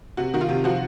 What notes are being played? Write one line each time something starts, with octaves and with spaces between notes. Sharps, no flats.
C3 F#4
D#3 F#4
F4
C3
F3 F#4